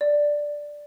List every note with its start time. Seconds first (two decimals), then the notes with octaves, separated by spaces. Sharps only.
0.01 D5